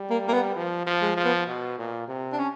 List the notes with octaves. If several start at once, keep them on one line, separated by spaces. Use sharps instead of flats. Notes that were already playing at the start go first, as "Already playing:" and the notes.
Already playing: G3
A#3
A#3
B3
F3
F3
G#3
F3
B3
B2
A#2
C3
D4
C#4